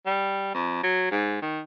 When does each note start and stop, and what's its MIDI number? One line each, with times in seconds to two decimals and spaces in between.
0.06 0.52 55
0.54 0.83 41
0.83 1.10 54
1.11 1.38 44
1.42 1.60 51